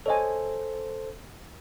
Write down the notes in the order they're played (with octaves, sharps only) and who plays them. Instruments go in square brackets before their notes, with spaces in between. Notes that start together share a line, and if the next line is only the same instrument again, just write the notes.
[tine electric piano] A4 C5 [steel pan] C#5 D#5 G#5